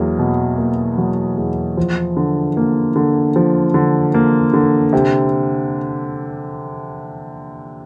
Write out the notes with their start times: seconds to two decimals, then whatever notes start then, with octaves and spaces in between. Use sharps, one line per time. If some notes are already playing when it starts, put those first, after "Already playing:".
Already playing: E2 F#3 A#3
0.19 B2
0.58 A#3
0.98 F#3
1.37 E2
1.77 F3
2.17 D3
2.57 A#3
2.96 D3
3.36 F3
3.74 D3
4.14 A#3
4.54 D3
4.93 C3